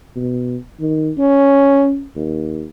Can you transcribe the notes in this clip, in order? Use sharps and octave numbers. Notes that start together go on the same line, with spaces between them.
B2
D#3
C#4
D#2